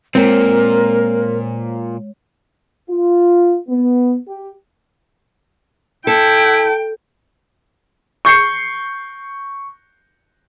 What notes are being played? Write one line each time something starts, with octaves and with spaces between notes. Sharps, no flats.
A#2 G#3 C4 A#4 C#5
F4
B3
G4
E4 A4 G5
C#6 G6 C7 C#7